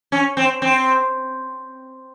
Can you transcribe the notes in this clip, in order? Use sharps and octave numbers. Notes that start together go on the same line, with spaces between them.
C#4
C4
C4